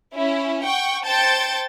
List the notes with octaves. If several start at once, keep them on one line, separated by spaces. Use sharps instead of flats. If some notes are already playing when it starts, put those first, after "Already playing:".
C#4 E4
F#5 G5 C#6
C5 G5 A5 G6 A6 C#7